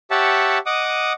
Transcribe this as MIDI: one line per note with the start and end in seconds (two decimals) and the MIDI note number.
0.11 0.58 67
0.11 0.58 73
0.11 0.58 76
0.11 0.58 78
0.11 0.58 81
0.66 1.13 75
0.66 1.13 78
0.66 1.13 86
0.66 1.13 87